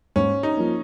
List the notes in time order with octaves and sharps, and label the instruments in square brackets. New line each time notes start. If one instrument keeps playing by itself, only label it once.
[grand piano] G#2 [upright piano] C#4
[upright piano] D#4
[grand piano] F3 A#3